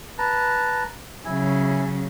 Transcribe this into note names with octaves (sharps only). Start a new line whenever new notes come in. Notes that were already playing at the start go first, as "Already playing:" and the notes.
B4 A5 A#5
C#3 F#3 E4 G#5